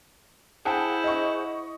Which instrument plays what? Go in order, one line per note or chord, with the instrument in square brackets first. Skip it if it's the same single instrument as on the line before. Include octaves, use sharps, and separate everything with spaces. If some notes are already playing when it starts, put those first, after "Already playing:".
[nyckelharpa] E4 [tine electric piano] G#4 F#5 [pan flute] C5 [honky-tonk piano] G5 A5
[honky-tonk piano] D#5 C#6